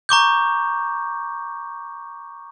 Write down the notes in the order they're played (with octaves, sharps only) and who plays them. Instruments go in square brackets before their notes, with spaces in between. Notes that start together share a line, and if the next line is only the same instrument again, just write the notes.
[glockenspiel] A#5 C#6 D6 G6